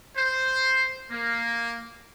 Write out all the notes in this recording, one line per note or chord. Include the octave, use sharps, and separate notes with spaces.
C5
A#3